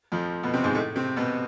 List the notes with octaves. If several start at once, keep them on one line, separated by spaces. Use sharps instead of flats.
F2 F3
B2 B3
C3 C4
G#2 G#3
A2 A3
C3 C4
B2 B3